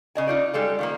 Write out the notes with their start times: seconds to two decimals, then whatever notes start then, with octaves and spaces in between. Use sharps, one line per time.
0.15 C#3 D#5 G#5
0.27 D#4 F4 D5
0.53 G3 G#3 A4 F5
0.79 D#3 F3 A#3